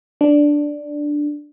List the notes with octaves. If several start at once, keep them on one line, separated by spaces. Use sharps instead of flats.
D4